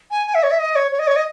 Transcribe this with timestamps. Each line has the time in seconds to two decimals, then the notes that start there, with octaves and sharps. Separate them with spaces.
0.11 G#5
0.27 G#5
0.34 E5
0.43 C#5
0.51 E5
0.59 D#5
0.75 C#5
0.91 C#5
0.99 D#5
1.07 C#5
1.16 D#5